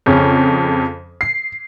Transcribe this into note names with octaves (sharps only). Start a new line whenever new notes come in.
F2 C#3 C#4
C7